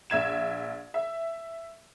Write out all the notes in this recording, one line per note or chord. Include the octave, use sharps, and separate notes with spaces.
A#1 E5 G#6 E7
E5